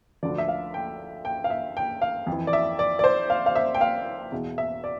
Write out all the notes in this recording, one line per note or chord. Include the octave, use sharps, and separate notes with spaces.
D2 D3 F3 D5
E5
F5
G5
G5
F5
E5
G5
F5
F2
E3
D5
E5
D5
D5
C5
F5
F5
E5
G5
F5
E2 B2
E5
D5